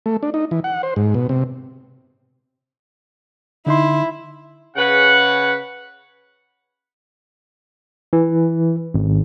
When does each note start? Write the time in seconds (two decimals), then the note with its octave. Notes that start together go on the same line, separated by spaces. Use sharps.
0.06 A3
0.23 D4
0.34 D#4
0.51 E3
0.64 F#5
0.83 C5
0.96 G#2
1.14 B2
1.29 C3
3.67 D3 D#4 E4 C6
4.77 C#3 B4 F#5
8.13 E3
8.94 G#1